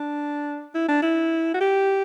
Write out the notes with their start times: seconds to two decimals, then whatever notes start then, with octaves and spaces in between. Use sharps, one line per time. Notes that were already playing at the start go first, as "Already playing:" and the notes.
Already playing: D4
0.75 E4
0.88 D4
1.02 E4
1.54 F#4
1.60 G4